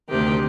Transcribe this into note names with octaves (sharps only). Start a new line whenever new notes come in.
D2 C3 D#3 G4